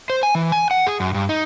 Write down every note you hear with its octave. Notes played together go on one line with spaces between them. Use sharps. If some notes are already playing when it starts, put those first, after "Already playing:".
C5
G#5
E3
G#5
F#5
G#4
F#2
G2
D#4